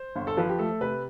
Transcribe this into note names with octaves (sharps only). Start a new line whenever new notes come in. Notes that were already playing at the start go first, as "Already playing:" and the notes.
Already playing: C5
G1
A4
F3 B4
G4
A3 A4
C3 B4